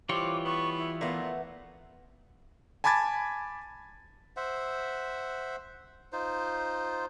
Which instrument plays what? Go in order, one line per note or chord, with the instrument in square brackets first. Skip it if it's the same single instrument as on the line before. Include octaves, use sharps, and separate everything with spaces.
[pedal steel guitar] E3 F4 C#5 [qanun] G3 [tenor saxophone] C4 [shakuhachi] D6
[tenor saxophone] B3 [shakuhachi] C#6
[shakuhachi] E4
[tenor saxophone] A#2 [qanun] A3 B3
[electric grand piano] G#5 A5 B5 D6 G#6 A6
[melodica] C5 E5 F#5
D#4 F4 C5